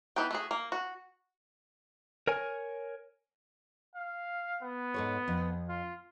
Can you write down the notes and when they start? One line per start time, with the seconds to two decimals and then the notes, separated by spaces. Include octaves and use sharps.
0.16 E3 B3 D#4 G5
0.31 A3 F#4 G#4
0.51 A#3
0.72 F#4
2.27 A#4 C#5 G#5
3.95 F5
4.62 B3
4.94 G#2 A4 C#5
5.28 F2
5.69 F4